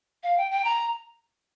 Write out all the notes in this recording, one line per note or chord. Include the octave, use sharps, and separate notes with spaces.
F5
G5
G5
A#5